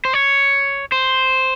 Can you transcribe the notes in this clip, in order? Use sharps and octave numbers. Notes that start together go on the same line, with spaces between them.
C5
C#5
C5